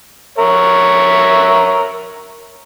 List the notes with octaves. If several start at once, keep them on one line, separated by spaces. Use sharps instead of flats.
A#4 C#5 E5